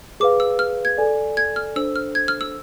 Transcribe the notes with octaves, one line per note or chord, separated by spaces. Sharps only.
G#4 B4 F5 D6
E6
F6
G#6
A4 D5 G#5
G#6
F6
D4 A4 C5 E6
F6
G#6
F6
E6